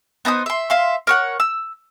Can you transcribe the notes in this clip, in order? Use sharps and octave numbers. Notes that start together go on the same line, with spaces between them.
B3 D#4 C5 D#6
E5 C6
E5 F5 C6
A#4 C#5 F#5
E6